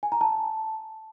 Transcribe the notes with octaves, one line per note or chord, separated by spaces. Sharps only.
G#5
A#5
A5